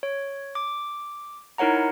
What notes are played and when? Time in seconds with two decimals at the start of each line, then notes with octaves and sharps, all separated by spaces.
0.03 C#5
0.55 D6
1.58 D#4 E4 A#4 C#5 F#5 A#5